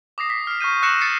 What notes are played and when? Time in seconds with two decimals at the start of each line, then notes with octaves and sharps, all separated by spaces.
0.18 D6 D#6 A#6 C7
0.30 B6
0.47 F6 C7
0.60 C#6 F6 G6 D#7
0.83 E6 F#6 A#6 C7 C#7 E7
1.01 A6 C7 C#7